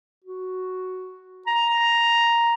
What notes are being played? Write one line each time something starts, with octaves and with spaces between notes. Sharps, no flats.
F#4
A#5